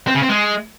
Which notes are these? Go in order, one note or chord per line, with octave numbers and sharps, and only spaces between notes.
C4
C#3
C4
G#3